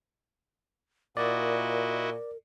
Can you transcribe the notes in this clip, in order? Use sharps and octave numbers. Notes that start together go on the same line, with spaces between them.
A#2 E4 F#4 A#4 D5 D#5